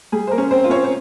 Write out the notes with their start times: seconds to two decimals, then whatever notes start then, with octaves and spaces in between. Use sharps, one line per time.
0.12 G3 G#4
0.27 C5
0.31 A#3 A#4
0.38 C#4
0.51 C4 C5
0.64 F4
0.70 C#4 C#5
0.84 C5